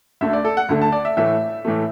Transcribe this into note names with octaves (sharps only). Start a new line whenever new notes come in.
D2 D3 A3 E5
D5
A4
F#5
D2 D3 A3
A5
D5
E5
A2 E3 A3 E5
A2 E3 A3